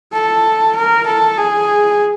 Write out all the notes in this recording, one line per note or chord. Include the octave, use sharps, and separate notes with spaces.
A4
A#4
A4
G#4